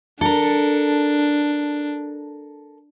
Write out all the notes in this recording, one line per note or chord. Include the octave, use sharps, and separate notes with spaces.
D4 A4 A#4